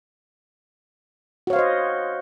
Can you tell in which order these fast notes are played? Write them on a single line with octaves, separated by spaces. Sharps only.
F#4 C#5 F5 C5 D#5